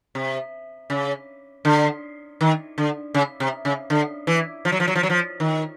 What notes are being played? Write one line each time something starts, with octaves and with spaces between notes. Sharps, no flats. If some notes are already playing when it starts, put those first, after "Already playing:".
C3
C#3
D3
D#3
D3
C#3
C3
C#3
D3
E3
F3
F#3
F3
F#3
F3
F#3
F3
D#3